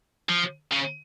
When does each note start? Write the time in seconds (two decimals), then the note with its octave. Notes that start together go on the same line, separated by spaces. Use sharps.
0.29 F3
0.72 C#3